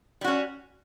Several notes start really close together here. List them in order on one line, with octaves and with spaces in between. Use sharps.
G3 F#4 C#4